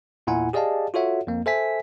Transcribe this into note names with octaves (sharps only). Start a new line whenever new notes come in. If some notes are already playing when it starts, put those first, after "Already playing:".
E2 A#2 E4 F#5 G#5
G4 G#4 D5 D#5 F5 A5
F4 F#4 A4 C#5 E5 F#5
F2 A#3
A4 C5 E5 G#5 B6